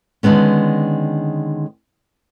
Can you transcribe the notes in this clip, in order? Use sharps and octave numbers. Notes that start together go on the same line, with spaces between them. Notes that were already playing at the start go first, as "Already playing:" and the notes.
D3 D#3 G#3 B3 C#4